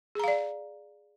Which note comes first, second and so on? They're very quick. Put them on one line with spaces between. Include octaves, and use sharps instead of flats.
G#4 A#5 F5 D5